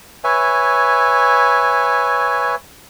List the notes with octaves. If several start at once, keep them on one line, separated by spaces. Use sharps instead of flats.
B4 C#5 E5 G#5